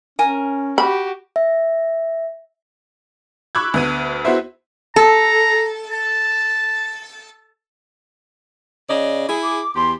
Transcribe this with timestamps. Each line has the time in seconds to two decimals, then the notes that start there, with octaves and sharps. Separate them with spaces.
0.19 C#4 A#4 G#5
0.78 F#4 G4 B5
1.36 E5
3.55 B5 C#6 D6 E6 F#6 G#6
3.74 D2 B3 D#7
4.25 B3 E4 F#4 C5 E5
4.96 A4 A#5
5.92 A5
8.90 C#3 D5 D#5
9.29 E4 G#4
9.43 D6
9.76 E2 G4 C6